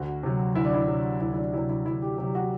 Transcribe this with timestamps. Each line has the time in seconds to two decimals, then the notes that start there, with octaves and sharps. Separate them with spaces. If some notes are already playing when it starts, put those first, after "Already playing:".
Already playing: D2 F#4
0.23 C3 F#3
0.55 D2 E4
0.65 D4
0.74 E4
0.88 C3 F#3
1.21 D2 E4
1.33 E4
1.37 D4
1.53 C3 F#3 E4
1.69 E4
1.86 D2 E4
2.02 G4
2.18 C3 F#3 G4
2.35 F#4